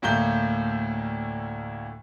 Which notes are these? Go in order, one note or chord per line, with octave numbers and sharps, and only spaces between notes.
D2 A2 A3 A#3 G6 G7